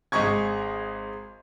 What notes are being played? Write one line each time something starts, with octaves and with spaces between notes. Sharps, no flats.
G#1 G#3 D#5 C#6 G#6